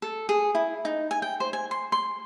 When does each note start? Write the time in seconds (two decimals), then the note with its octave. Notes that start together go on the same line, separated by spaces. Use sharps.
0.02 A4
0.29 G#4
0.55 E4
0.85 D#4
1.11 G#5
1.22 G5
1.40 C5
1.53 G#5
1.71 C6
1.92 C6